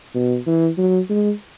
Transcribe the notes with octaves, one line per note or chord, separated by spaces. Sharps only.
B2
E3
F#3
G#3